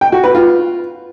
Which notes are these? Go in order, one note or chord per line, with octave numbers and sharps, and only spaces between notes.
G5
F#4
B4
F4